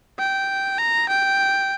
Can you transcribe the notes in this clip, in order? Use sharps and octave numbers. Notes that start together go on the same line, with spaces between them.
G5
A#5
G5